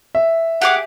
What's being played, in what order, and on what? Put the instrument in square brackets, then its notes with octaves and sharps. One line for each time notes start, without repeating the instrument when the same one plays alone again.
[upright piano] E5
[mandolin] G4 G#4 D6 [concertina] F#5